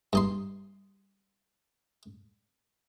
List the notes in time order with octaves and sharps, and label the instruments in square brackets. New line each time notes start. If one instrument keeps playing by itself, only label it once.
[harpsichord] G2 D#4 C6